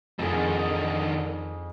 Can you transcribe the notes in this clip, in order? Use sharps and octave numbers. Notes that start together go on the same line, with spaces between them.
F2 D3 D#3 G#4 G#5